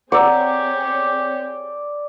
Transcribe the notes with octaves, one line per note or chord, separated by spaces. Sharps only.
C4 G4 G#4 C#5 D5 F#5 A#5 E6